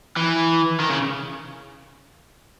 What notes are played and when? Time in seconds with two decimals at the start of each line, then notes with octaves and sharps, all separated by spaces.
0.17 E3
0.80 D#3
0.90 C#3